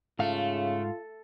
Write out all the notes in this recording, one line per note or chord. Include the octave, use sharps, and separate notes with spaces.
G#2 C#3 A3 F4 F5